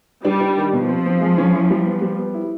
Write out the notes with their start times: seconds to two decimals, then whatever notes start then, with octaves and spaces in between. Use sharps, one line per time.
0.25 G3 D4
0.41 D4
0.58 D#3
0.73 B2 F3
0.89 C4
1.06 C4
1.21 G#3
1.38 C#4
1.54 E4
1.71 G3
1.86 B3
2.02 G3
2.18 B3
2.34 E4